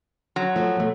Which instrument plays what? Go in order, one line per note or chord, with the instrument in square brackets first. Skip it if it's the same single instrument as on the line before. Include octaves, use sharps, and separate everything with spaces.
[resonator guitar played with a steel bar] F#3
[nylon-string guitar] F3 A3
B2 A3